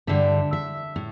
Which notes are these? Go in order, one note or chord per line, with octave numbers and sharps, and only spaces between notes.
G2 D3 G3 E5
E5
A2